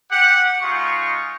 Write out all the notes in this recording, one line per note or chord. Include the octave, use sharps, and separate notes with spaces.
G4 F#5
G#3 D#4 F4 C#6